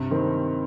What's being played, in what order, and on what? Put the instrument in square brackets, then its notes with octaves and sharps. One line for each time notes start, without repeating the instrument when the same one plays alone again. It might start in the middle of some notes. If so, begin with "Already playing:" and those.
Already playing: [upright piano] G2 [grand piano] C3
[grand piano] D#3 C4